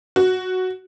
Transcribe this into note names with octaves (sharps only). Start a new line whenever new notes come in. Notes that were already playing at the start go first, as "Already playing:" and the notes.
F#4